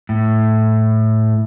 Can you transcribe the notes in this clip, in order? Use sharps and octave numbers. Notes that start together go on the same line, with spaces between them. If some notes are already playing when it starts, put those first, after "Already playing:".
A2